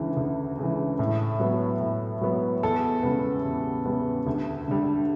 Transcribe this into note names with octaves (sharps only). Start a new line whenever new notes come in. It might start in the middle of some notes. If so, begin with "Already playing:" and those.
Already playing: D2 C#3 E3
D2
C#3 E3
A2
F#3 B3
A2
F#3 B3
E2 A4
C#3 G3 B3
E2
C#3 G3 B3
D2
D3 G3